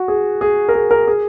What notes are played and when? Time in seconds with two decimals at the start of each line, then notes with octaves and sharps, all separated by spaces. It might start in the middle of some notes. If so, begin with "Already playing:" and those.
Already playing: F#4
0.08 G#4
0.41 G#4
0.69 A#4
0.74 G#4
0.91 A#4
1.08 G#4